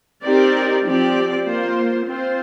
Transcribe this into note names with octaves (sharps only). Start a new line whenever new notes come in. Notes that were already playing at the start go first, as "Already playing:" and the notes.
C4 D#4 G4 A#4 D5
F3 C4 G4 D5
A#3 F4 C5
C4 F4 C5